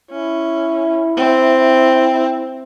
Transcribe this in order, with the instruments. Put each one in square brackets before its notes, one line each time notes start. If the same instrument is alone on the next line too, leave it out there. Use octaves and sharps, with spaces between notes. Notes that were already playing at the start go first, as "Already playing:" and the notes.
[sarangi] C#4 [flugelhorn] E4
[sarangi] C4